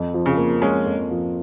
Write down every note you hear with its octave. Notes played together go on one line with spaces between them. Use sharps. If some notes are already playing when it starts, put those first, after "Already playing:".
Already playing: F2
F3
C#3
A#3
G#3 C#4 F4
F2
F3